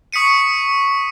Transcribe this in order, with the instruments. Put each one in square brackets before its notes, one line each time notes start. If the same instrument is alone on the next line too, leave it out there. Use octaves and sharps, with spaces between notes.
[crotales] C#6 D#6 B6 C#7 D#7